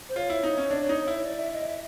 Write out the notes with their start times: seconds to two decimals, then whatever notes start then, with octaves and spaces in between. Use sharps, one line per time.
0.09 C5
0.16 F4 C#5
0.30 E4
0.43 D#4
0.58 C#4
0.71 D4
0.89 D#4
1.07 E4
1.17 C#5
1.25 D5
1.39 E5
1.53 D#5
1.67 E5